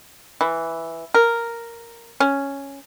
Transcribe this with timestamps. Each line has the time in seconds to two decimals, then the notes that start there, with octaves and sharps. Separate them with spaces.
0.41 E3
1.14 A#4
2.20 C#4